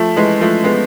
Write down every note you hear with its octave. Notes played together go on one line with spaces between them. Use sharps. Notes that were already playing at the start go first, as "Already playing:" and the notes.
Already playing: F3 A3
E3 G#3
F3 A3
G#3 B3